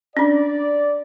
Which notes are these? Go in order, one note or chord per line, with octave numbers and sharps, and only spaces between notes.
C#4 D4 D5